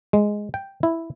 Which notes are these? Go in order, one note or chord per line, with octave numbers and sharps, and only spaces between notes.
G#3
G5
E4